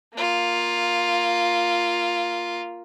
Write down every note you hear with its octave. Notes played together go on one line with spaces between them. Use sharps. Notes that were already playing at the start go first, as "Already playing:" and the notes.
A#3 F4